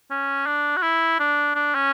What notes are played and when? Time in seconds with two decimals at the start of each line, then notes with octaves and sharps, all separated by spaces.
0.10 C#4
0.46 D4
0.77 F#4
0.82 E4
1.20 D4
1.55 D4
1.75 C#4